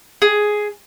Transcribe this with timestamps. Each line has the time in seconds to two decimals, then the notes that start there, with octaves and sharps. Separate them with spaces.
0.22 G#4